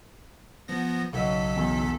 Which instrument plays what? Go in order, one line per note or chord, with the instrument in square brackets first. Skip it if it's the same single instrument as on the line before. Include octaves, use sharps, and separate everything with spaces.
[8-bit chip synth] F3 B3 A#6
[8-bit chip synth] B1 A4 B6 [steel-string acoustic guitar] C#3 F#3 D#5
[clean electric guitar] E2